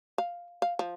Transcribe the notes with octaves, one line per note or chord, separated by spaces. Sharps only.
F5
F5
F3